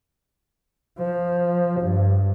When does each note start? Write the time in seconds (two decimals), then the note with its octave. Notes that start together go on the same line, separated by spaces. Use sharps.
0.99 F3
1.81 G2